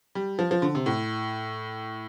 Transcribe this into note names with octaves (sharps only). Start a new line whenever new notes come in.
G3
F3
F3
D3
C3
A2